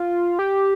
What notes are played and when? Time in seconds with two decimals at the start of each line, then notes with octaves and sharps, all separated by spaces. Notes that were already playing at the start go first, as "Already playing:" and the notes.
Already playing: F4
0.39 G4